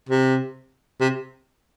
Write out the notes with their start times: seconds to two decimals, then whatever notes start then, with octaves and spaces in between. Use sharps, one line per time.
0.09 C3
1.01 C3